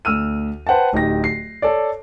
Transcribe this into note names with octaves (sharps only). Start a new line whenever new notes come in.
D2 E6 F6 D#7
B4 C5 F#5 G5 A5
D1 D#4 G4 A#6
C7
A4 C#5 D5